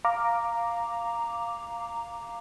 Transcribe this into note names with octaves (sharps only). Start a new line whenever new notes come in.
F5 A#5 D6